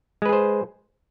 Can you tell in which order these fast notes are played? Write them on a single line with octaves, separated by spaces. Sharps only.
G#3 B4 G#4 C5